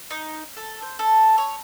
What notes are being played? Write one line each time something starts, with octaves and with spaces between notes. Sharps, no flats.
D#4
A4
C5
A4
C#5